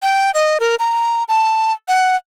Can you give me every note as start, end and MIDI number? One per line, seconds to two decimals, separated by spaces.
0.03 0.31 79
0.34 0.58 75
0.60 0.76 70
0.79 1.24 82
1.29 1.73 81
1.88 2.16 78